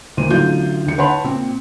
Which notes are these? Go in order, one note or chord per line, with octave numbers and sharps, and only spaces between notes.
D#2 A#2 C5 D#7
A1 D3 F#3 F4 G6
D#2 D3 C#7
B4 C#5 F#5 A5 B5 C6
A#2 C4